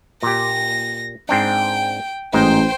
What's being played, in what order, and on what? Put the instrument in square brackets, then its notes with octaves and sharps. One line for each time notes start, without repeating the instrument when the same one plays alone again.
[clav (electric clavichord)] A#2 G4 [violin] A#6
[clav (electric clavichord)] G#2 C4 D4 [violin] G5
[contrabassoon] A1 [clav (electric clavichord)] G#2 D#4 [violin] C5 G5